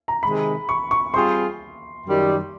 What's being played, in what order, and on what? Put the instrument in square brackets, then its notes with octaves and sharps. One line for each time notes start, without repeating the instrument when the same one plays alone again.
[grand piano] A#5
[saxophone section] C3 D#3 G#3 [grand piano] B5
[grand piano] C#6
C#6
[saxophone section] G3 C4 F4 G#4 C5 [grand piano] C6
[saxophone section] F#2 D#3 G3